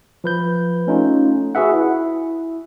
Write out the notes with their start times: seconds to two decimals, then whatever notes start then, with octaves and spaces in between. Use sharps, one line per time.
0.24 F3 B4 G6
0.87 A3 C#4 D#4 F4 A4
1.55 F#4 G#4 B4 E5 F#5
1.72 E4